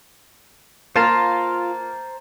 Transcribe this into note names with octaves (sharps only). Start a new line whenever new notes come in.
A#3 F4 C5 F5 A5 A#5